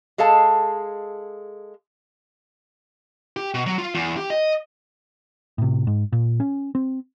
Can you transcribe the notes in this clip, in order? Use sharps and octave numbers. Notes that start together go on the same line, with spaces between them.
G#3 G#4 A4 F5 A5
G4
B2
F#3
F4
E2
G4
D#5
A2 C3
G#2
A#2
C#4
C4